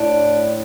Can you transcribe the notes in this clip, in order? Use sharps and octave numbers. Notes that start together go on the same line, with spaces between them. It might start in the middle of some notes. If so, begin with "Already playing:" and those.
Already playing: A2 D4